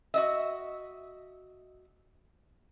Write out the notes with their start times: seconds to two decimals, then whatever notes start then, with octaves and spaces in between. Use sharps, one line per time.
0.14 F#4 D#5 E5